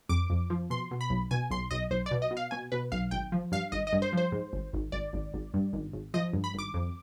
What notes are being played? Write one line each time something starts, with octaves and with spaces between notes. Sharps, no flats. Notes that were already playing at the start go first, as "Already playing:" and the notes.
F2 D6
F2
F3
B2 C6
B2
B5
B1
B2 G#5
B1 C6
B1 D#5
B1 C5
D5
B2
D#5
B2
F5
B2 G#5
B2 B4
B1 F5
G#1 G5
F3
G2 F5
G#1 D#5
D#5
G2
C5
F3 C5
G#2
G#1
G#1
G#1 D5
G#1
G#1
G2
G#1
G#1
F3 D#5
G2
B5
G#1 D6
F2